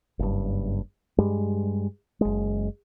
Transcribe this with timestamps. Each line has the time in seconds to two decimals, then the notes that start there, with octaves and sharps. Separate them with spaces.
0.19 F#1 G2
1.18 G2 G3 G#3
2.21 F#1 G#3